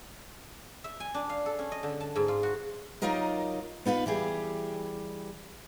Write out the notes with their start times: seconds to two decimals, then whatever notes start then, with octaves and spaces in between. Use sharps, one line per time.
0.84 E5
1.00 G#5
1.14 D4
1.29 F5
1.46 A4
1.59 C#4
1.72 D#5
1.83 D3
2.00 A5
2.16 G#2
2.28 F4
2.43 F#4
3.02 F#3 D#4 F4 G4 A#4 D#5
3.85 B3 D#4 F4 B4
4.06 E3 G3 G4 G#4